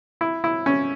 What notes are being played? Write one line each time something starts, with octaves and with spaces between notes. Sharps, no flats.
E4
E4
C#4